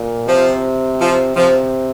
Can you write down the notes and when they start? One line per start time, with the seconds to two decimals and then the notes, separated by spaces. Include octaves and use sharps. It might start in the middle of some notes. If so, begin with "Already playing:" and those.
Already playing: A#2
0.28 C3 F3
1.01 F3
1.36 C3 F3